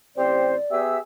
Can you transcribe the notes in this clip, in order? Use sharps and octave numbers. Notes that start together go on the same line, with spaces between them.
A1 C4 G4 C5 D5
B3 G4 G#4 E5 E6